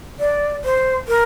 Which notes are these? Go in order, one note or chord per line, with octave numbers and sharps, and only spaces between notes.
D5
C5
A#4